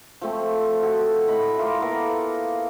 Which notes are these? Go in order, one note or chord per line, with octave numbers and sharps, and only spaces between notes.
F3 A3 C4
F#4 A4
A2 D#5 B5
E4 F4 A#4 D6
A#3 B3 A4 A#4